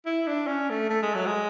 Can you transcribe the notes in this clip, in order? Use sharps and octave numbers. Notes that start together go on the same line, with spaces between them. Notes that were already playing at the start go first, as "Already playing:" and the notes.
E4
D4
C#4
A3
A3
G#3
F#3
G#3